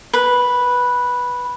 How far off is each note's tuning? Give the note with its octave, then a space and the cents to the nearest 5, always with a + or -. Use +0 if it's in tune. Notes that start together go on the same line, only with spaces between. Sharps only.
B4 -5